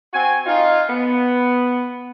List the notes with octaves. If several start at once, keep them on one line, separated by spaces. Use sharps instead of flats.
C4 F#4 G#5
D#4 F4
B3